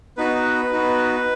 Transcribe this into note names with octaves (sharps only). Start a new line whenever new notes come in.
B3 D#4 F#4 B4
B3 D#4 F#4